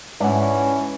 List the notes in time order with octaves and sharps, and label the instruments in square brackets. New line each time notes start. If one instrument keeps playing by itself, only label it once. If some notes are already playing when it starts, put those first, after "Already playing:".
[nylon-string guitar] G#2 E5 [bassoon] E3 [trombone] C#4 [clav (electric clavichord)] D4 F#5